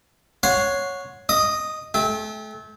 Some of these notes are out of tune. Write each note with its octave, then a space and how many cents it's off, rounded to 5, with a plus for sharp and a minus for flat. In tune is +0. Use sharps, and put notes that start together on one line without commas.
C#5 +0 F#5 -20 C6 -5
D#5 +0 D#6 -35
A3 -35 G5 +30